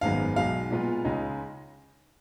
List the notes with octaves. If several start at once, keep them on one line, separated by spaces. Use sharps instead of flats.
G#1 F#2 D#3 G#3 B3 F5
B1 B2 G#3 F5
A#2 G#3 B3 F4
C#2 C#3 G#3 D#4